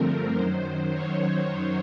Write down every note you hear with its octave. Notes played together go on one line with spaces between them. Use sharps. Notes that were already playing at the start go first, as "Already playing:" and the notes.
Already playing: G2 D3 F3 A3 C4 A#4
F#2 D#3 F#3 C5
C#5